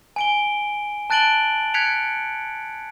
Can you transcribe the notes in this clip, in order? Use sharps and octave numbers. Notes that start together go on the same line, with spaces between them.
G#5 D7 G7
A5 F#6 A6 D7 F#7 G7
F#6 G#6 B6 C#7 D7 F7